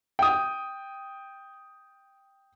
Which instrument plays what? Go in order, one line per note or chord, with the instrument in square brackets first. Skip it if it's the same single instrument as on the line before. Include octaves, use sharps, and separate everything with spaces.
[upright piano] G5 D#6